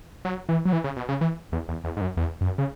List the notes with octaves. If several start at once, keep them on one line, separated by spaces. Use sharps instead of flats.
F#3
E3
F#3
E3
C#3
B2
C#3
E3
E2
E2
E2
G#2
F#2
E2
F#2
C#3